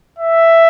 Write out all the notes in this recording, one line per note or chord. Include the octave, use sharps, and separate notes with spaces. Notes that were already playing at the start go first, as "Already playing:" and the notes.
E5